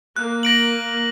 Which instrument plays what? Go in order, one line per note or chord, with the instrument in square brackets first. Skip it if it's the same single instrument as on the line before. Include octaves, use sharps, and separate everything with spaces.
[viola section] A#3 [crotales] F#6
[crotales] A#6 D7 F#7